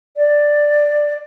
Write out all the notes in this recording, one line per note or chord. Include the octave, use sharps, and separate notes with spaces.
D5